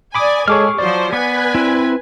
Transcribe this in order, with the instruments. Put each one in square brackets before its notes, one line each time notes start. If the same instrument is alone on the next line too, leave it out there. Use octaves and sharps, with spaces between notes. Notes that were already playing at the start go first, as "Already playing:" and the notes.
[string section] D5 G#5 [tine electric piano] B5 D6 D#6
[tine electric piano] G#3 A4 C#5 [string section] G#4 [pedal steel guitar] C#6 D6 F6
[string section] F3 F#3 C5 [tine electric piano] D5
[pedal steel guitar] B3 [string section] B4 G#5 G#6
[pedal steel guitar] C4 E4